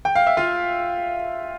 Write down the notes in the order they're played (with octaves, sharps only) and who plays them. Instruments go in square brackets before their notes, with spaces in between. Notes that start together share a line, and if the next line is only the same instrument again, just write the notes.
[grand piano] G5
F5
E5
F4 F5